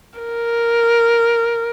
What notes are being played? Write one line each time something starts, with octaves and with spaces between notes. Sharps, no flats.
A#4